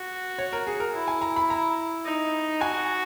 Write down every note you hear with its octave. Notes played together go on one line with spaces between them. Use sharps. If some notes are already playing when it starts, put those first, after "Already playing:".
Already playing: F#4
C#5
A#4
G#4
A#4
E4
G#5
A#5
B5
A#5
D#4
F#4 G#5